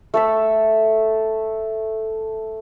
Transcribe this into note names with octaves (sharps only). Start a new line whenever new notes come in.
A3 A4 E5